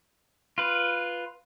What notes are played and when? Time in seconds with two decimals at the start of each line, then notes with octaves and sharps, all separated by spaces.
0.58 F4 B4